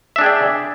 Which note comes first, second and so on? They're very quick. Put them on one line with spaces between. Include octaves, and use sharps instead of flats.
E5 D4 G#4 G5 D5